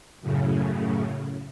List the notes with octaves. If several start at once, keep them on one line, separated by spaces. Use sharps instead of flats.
F#2 A2 C#3